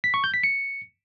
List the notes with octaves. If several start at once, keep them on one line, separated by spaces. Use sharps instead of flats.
B6
C#6
G6
B6
C#7